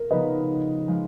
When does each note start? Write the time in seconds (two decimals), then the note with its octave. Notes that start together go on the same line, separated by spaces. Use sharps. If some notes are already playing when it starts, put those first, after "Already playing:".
Already playing: A#4
0.10 C#3 F3 B3 D#4 B4 D#5
0.87 F3 G#3